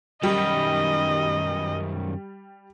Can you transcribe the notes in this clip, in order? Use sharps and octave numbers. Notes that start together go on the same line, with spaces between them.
F#2 D#3 G3 D#5